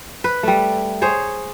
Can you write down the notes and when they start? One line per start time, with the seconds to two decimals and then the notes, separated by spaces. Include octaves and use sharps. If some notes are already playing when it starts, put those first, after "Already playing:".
0.24 B4
0.43 G3 A3
1.02 G#4 C5 C#5